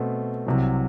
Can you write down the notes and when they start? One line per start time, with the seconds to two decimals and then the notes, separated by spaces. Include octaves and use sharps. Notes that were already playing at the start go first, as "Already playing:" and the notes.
Already playing: B2 A3 C4
0.47 C2 C3 F#3